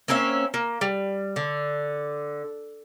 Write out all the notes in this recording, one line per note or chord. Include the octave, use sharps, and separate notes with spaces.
A#3 C4 C#4 E5
A#3
G3
D3